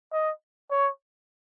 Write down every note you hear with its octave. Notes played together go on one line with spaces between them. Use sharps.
D#5
C#5